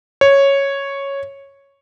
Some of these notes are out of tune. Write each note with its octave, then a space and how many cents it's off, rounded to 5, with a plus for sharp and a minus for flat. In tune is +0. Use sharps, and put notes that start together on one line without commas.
C#5 -5